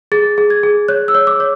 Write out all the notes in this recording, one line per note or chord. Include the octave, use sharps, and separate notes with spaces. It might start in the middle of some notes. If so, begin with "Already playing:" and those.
G#4 A6
G#4
G#6
G#4
C#5 F#6
E6
C#5
D6
C#5